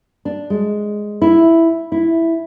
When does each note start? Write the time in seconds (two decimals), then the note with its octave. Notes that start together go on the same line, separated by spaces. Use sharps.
0.25 D4
0.50 G#3
1.22 E4
1.92 E4